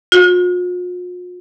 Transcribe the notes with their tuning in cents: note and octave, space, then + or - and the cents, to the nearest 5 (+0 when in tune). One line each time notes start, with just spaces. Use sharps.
F4 +45